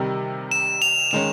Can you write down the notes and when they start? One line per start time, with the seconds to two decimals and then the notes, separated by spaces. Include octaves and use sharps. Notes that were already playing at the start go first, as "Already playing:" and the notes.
Already playing: C3 D#3 G3
0.51 E7
0.82 F7
1.11 D#3 G#3 C#4 E7